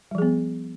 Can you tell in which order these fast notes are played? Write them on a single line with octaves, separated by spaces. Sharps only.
G3 F3 G#4 B3